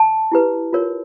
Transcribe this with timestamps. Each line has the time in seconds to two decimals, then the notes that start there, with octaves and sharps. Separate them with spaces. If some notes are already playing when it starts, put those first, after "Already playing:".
Already playing: A5
0.32 E4 G4 B4
0.73 F4 A#4 C#5